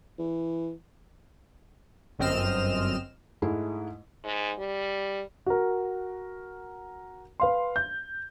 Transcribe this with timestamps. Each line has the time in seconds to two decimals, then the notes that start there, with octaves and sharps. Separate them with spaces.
0.19 E3
2.19 G1 F#2 C4 D#5 F6 E7
3.42 G#2 G#3 A3 E4
4.24 G#2
4.58 G3
5.46 F#4 A#4
7.40 B4 F5 C6
7.76 G6